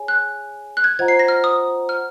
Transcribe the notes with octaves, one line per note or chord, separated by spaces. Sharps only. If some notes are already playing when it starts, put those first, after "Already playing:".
Already playing: G#4 C#5 G#5
F#6
F#6
G#6
F4 C5 D#5 F#5 A#5 G#6
C7
A#6
F6
D#6
F6